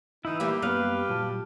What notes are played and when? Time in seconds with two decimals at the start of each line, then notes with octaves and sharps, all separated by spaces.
0.25 E3 D#4 E4
0.40 G3 A#3 G4 E5
0.62 F#2 G3 A#3 B3 B4 F5
1.09 A#2 F#3 A5